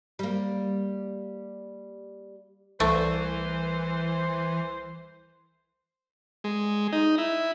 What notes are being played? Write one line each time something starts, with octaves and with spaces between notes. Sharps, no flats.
G3 A#3
C2 E3 A3 C5
G#3
D#4
E4